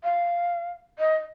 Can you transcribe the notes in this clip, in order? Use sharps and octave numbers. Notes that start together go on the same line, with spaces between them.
F5
D#5